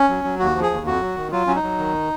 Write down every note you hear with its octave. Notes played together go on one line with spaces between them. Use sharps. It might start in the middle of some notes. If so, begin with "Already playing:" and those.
Already playing: C#4
F#3
F#3
D#2 F#4
F3
G#4
D#2
F2 F#4
F#3
D#3
F#3 F4
F#3 C#4
D#4
F#3
D#3